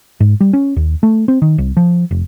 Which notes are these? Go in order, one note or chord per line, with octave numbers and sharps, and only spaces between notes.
G#2
G3
C#4
D#2
A3
C4
D#3
C2
F3
F1